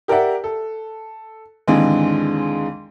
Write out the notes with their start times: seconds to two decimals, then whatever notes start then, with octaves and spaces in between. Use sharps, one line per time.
0.08 G4 A#4 D5 E5 F#5
0.44 A4
1.67 D#2 G#2 D3 E3 G#3 C4